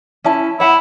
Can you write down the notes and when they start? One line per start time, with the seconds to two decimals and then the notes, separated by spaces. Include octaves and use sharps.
0.24 C#4 E4 A5
0.60 E4 C#5 F#5